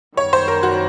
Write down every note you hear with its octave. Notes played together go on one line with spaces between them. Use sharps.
F#2 D#3 G3 B3 C#5
C5
A#4
F#4